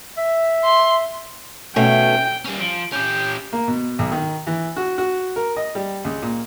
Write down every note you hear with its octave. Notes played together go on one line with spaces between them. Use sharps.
E5
C6
B2 A3 C#4 G5
G3 C#4
F3 D7
C#4 G4 G6
A#3
B2
B1
D#3
E3
F#4
F#4
A#4
D#5
G3
C#2
A#2